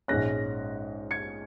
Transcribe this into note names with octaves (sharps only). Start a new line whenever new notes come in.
A#1 G#2 G#3 C#4 F#6 A#6
G#6 C#7